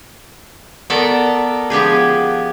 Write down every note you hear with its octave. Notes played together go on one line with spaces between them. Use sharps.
B3 A4 A#4 D5 A5
F3 B3 G4 G#4